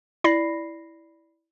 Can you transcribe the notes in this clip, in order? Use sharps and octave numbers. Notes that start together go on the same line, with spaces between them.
E4 D5 B5 A#6 C7